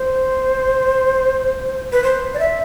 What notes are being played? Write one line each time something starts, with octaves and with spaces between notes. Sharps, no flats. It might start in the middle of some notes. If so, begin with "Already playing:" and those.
Already playing: C5
B4
C5
D5
E5